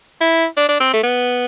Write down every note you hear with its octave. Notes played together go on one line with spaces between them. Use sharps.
E4
D4
D4
C4
A3
B3